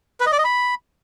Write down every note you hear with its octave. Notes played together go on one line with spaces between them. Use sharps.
B4
D#5
D5
D#5
B5